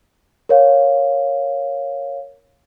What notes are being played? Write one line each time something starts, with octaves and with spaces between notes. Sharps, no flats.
A#4 C#5 F5